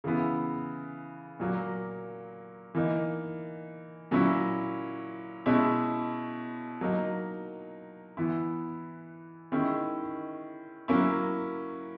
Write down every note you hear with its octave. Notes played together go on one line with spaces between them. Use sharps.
C#3 E3 B3 E4
A#2 F#3 A#3
E3 A#3 D#4
A#2 F#3 C#4 E4
B2 G#3 C#4 E4
F#3 A#3 D#4
E3 B3 E4
D#3 G#3 C#4 E4
F#3 A#3 C#4 E4